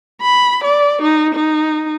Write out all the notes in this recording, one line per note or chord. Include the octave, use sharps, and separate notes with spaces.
B5
D5
D#4
D#4